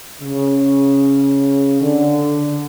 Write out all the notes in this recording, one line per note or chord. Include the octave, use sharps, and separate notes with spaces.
C#3
D3